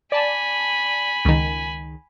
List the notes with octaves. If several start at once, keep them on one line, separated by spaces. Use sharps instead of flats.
D5 G#5 A5 B5
C#2 D#3